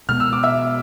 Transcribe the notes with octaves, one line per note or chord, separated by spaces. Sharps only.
B2 G#3 B3 F6
E6
D6
E5 E6